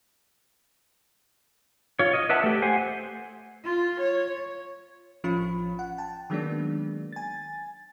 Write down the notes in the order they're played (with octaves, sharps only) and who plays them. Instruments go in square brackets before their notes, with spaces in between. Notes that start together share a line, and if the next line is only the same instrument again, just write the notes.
[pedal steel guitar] F4 C#5
D#5
B4 D5 E5 F#5 A5
A3 G4
C5 F#5 G#5
[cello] F4
C#5
[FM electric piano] A1 F3 C#4 F4 B5
F#5
G5 A5
D#3 F#3 G#3 A#3 B3 D4
G#5 A6